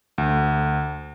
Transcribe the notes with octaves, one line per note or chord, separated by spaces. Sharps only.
D2